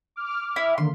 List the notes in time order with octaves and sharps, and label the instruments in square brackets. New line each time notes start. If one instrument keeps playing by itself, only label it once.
[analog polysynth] D6 F6
[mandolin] E4
[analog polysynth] D3 D#3 A#3 [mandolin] C6